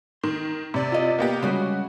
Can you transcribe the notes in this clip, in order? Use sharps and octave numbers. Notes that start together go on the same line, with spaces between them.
D#3 C6
C3 D5
F4 D#5
A#3 B3 G4
C#3 G3 G#3 F#4